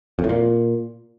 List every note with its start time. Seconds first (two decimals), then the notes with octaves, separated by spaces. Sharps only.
0.19 F2
0.24 A2
0.29 A#2